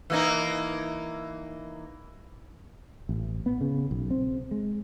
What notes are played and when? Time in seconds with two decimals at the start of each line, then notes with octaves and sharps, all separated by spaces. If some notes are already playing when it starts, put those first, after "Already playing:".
0.10 E3 A#3 D#4
3.09 A1
3.46 B3
3.61 C#3
3.91 B1
4.10 C4
4.51 G#3